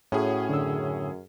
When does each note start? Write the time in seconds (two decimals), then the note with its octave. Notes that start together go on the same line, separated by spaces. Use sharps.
0.12 A2 C#4 F#4 G#4
0.49 F#2 D3 E6